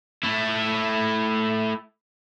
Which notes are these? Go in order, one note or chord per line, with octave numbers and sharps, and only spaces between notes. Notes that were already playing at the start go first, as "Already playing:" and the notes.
A3 E4